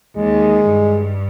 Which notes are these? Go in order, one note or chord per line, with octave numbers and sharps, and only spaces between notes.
D#2 D#3 G#3
G2